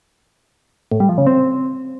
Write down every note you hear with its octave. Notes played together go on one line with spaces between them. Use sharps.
A2
G3
F3
C#3
C4